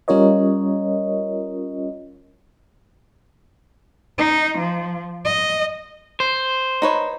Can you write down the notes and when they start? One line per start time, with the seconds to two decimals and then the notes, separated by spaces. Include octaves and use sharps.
0.08 G3 C#4 F4 A#4 C#5 D#5
4.18 D#4
4.58 F3
5.25 D#5
6.20 C5
6.82 D#4 B4 C#5